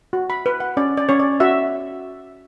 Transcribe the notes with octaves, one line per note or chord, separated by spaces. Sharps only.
F#4
B5
B4
F#5
C#4 D5
D5
C#4 C#5
D5
F#4 E5